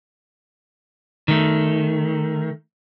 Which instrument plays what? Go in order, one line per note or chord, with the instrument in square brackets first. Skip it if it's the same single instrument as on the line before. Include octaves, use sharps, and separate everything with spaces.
[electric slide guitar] D#3 A3